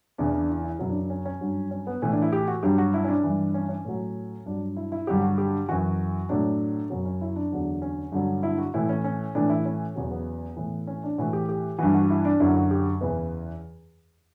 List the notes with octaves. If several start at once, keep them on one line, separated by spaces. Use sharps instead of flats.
E2 C#3 E3 D4
D4
E4
E4
F#2 C#3 F#3 E4
D4
D4
C#4
C#4
G2 F#3
C#4
B3
A2 E3 C#4
D4
E4
G4
F#4
G2 F#3 G4
F#4
E4
C#4
D4
G2 E3
C#4
C#4
A2 F#3
G2 F#3 D4
E4
E4
G2 D3 F#3 G4
F#4
G4
F#2 E3 F#4
A2 F#3 D4
F#2 C#3 F#3 C#4
C#4
E4
D4
E2 D3 F#3
C#4
G2 D3 F#3
E4
F#4
A2 E3 E4
C#4
C#4
A2 E3 D4
E4
C#4
E2 C#3 F#3
B3
A2 E3
C#4
D4
A2 E3 F#4
G4
G4
G2 E3 F#4
F#4
E4
D4
F#2 D3 F#3 E4
F#4
G4
E2 C#3 E3 B4